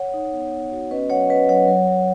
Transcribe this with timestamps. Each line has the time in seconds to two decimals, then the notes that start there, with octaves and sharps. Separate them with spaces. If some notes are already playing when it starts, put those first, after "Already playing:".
Already playing: C#5 F#5
0.14 D#4
0.32 B3
0.52 B3
0.71 F#4
0.91 C#4 B4 D#5
1.10 F#3 C#5 F#5
1.29 C#4 B4 D#5
1.49 F#3 C#5 F#5
1.68 F#3
1.87 F#3